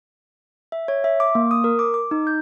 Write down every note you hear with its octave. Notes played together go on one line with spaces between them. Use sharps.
E5
C#5
E5
D6
A#3
D#6
A#4
D6
D6
D#4
G6